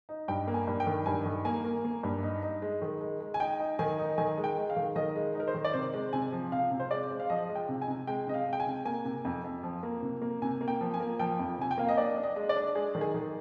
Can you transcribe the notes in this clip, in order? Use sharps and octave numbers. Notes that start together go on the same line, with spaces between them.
D#4
G2 G5
A#3
G#5
G2
G5
D#3
G2 G#5
D#3
A#3 G#5
A#3
A#3
G2
D#4
D#4
G#3
D#3
G#3
G#3
G#5
D#4 G5
D#4
D#3 G#5
D#4
D#3 G#5
G#3
G5
G#3
F5
D#3
D#3 D#5
G#3
D#4
A#4
C5
D#3
D5
C3 C5
G#3
C3 G#5
F3
C3 F5
C3
C5
G#3 D5
G#3
F5
F3 D#5
G#3
G5
C3
G#5
C3
G#3 G5
C3 D#5
F5
G#3
G5
G#5
C3
A#3 G#5
C3
F2
F2
F3
A#3
C3
A#3
C3 G#5
A#3
G5
F3
G#5
A#3
F3 G5
F2
C3 G#5
G5
A#3 F5
D#5
D4 D5
D4
D#5
G#3
D5
D4
G#3 G#4
D#3
G#4
D#3